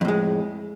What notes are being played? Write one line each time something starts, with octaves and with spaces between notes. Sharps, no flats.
F2 A2 G#3